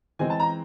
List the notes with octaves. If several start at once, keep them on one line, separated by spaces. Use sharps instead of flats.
E3 G#3 C4 G#5
A5
A#5